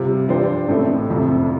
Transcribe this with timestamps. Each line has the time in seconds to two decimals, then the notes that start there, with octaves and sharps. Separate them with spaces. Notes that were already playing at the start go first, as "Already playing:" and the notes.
Already playing: C3 G3 F4
0.28 G2 F3 D4 G4 C5
0.68 A1 A2 A3 C4 A4
1.09 F1 F2 C3